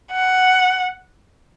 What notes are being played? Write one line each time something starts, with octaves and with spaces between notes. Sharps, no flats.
F#5